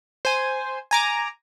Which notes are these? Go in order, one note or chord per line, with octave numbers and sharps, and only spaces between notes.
C5 G#5
G#5 A#5 D6